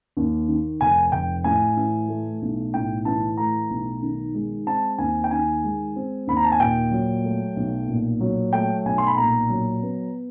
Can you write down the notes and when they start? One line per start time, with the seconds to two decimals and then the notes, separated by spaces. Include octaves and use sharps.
0.17 D#2
0.48 D#3
0.81 F1 G#5
1.12 F1 G5
1.44 A2 G#5
1.77 E3
2.09 A3
2.42 B1
2.74 A2 G5
3.05 E3 A5
3.37 A3 A#5
3.70 B1
4.02 D#3
4.34 G#3
4.67 C4 A5
4.98 D#2 G#5
5.24 G5
5.31 D#3 G#5
5.64 G#3
5.96 C4
6.27 D#2 B5
6.37 A#5
6.45 A5
6.52 G#5
6.60 A#2 G5
6.92 F#3
7.24 A3
7.56 B1
7.88 A#2
8.20 F#3
8.53 A3 G5
8.85 B1 G#5
8.98 C6
9.07 B5
9.17 A#2 A#5
9.50 F#3
9.82 B3